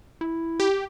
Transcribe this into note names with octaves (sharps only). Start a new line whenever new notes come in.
E4
G4